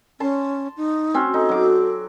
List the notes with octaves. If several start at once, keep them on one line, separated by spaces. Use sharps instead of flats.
C#4 A5 C6
D#4
C4 C#4 F#4
D#4 A4
F#3 D6